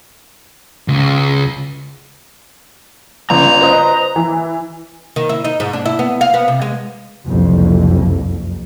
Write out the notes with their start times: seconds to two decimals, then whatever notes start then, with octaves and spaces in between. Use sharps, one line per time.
0.88 C#2
3.30 G1 C#3 A#5
3.61 B4 C5 D#5
4.16 E3
5.16 D#3
5.29 E4
5.44 D#4
5.60 G#2
5.73 D4
5.86 E4
5.99 B3
6.21 F5
6.34 B3
6.48 C3
6.61 G#3
7.27 F#1 C2 F2